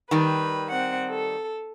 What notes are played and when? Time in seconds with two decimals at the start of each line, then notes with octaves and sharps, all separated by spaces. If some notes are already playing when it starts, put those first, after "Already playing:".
0.11 D#3 G3 B4
0.71 C4 F#5
1.10 A4